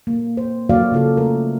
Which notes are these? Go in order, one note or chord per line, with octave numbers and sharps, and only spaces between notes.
A#3
C5
F#3 A#3 F#4 D5 F5
C#3 F4 A4
A3 A#4